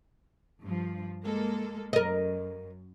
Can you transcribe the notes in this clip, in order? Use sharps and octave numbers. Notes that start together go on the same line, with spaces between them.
G2 F3
G#3 A#3 A4
F#2 A#4 D#5